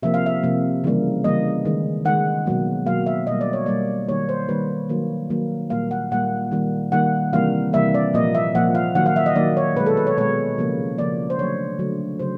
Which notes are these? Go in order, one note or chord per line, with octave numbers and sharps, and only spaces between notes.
C3 F3 A#3 E5
F5
E5
C3 F3 A#3
C#3 E3 G3 A#3
C#3 E3 G3 A#3 D#5
D#3 G#3
D#3 G#3 F#5
B2 F#3 A#3
B2 F#3 A#3 F5
E5
B2 G3 A#3 D#5
D5
C#5
B2 G3 A#3 D5
D#3 G3 A#3 C#5
C5
D#3 G3 A#3 B4
D#3 F#3 A#3
D#3 F#3 A#3
A#2 G3 A#3 F5
F#5
A#2 G3 A#3 F#5
D#3 G3 A#3
D#3 G3 A#3 F#5
C3 E3 G3 A#3 F5
C3 E3 G3 A#3 E5
D5
A#2 F3 A#3 D#5
E5
A#2 F3 A#3 F#5
F5
D#3 F#3 A#3 F#5
F5
E5
D#5
D#3 F#3 A#3 D5
C#5
B2 G#3 B4
A4
B4
C#5
B2 G#3 C#5
C#3 F3 A#3
C#3 F3 A#3 D5
C5
D3 F#3 A3 C#5
D3 F#3 A3
C#3 F#3 C5